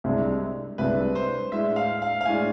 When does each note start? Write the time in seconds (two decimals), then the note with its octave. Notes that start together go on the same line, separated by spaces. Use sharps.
0.04 C2 C3 G#3 D4
0.78 C2 C3 G#3 D4 B4
1.15 C5
1.52 A2 G#3 D4 E5
1.76 F5
2.02 F5
2.21 F5
2.25 A2 G#3 D4 G#5